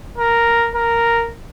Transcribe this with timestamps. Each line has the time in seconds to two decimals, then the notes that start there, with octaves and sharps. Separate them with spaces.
0.18 A#4
0.75 A#4